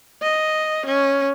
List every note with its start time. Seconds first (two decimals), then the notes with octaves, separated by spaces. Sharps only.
0.22 D#5
0.86 C#4